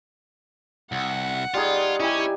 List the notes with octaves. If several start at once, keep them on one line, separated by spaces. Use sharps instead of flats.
C2 F#5
G3 D#4 F4 G#4
C#4 D#4 E4 G4 G#5